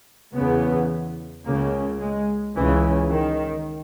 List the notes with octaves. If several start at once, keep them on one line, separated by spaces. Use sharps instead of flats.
E2 C#3 B3
C#2 C#3 A#3
G#3
C#2 C#3 E3
D#3